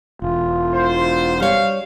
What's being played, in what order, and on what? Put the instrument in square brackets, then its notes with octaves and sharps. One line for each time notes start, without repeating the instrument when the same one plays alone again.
[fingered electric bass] E1 [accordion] F4
[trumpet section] C5
[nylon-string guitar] G3 C#5 [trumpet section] F5